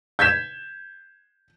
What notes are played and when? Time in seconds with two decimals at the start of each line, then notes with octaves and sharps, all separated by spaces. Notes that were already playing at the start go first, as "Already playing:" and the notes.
0.19 G6 G#6 B6 E7